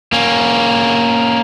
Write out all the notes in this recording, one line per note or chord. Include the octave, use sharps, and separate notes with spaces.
A#3 C#4